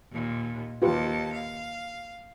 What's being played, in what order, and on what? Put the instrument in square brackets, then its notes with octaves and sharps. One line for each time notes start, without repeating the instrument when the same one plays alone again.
[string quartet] D#2 A#2
[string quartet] D#2 A5 [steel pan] F4 G4 B4
[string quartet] F5